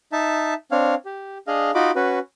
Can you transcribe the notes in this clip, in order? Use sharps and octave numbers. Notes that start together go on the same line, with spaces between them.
D#4 E5 A5
C4 D4 C#5 F5
G4
D4 G#4 D#5 F5
D#4 F4 F#4 D#5 B5 D6
C#4 F#4 B4